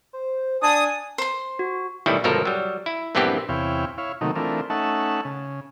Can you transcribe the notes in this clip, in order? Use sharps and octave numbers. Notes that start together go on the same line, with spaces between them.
C5
D4 G#5 A5 D#6
C5 C6
F#4
B1 A2 D#3 E3 G3 E4
G1 C#2 B2 F3 A4 A#4
F#3 G3
E4
A#1 G2 E3 B3 C4 G4
E2 C3 E4 C#5 F5 G5
E4 C#5 F5
C3 D#3 F#3 A3 A#3 D#4
E3 A3 C4 D4 F4 A#4
A3 C#4 D#4 E5 F#5 A5
C#3